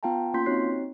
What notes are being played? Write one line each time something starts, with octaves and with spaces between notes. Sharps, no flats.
B3 F4 F5 G5 A5 A#5
A#3 C#4 F4 C6 G6 B6
C4 D#4 F#4 C#5 F#6 C7